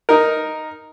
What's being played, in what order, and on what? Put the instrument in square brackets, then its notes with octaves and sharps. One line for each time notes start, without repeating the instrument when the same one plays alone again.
[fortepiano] D#4 A#4